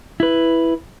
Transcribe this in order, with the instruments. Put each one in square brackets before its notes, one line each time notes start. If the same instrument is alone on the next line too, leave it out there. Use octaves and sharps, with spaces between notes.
[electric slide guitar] E4 B4